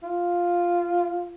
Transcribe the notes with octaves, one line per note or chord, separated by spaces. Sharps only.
F4